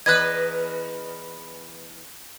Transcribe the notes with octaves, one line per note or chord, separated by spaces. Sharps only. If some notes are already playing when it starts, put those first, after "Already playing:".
E2 B4 D#5 F#6 G#6